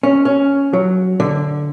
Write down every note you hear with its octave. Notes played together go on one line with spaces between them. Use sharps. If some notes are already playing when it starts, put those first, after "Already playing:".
C#4
C#4
F#3
D3